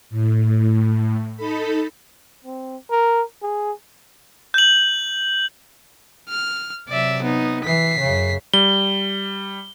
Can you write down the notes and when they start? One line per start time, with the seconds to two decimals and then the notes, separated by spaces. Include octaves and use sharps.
0.10 A2
1.35 D#4 A4 B5
2.44 C4
2.90 A#4
3.43 G#4
4.54 G6 F#7
6.29 F6
6.89 C3 F#3 D5 E5
7.23 B3 D#4
7.65 E3 B6 C7
7.99 F#2 C#3
8.53 G3 G7